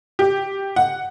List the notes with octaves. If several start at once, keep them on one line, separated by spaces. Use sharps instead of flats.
G4
F#5